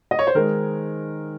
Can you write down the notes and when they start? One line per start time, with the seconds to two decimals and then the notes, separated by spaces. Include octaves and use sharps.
0.11 D#5
0.19 C#5
0.27 C5
0.35 D#3 G#3 D#4 A#4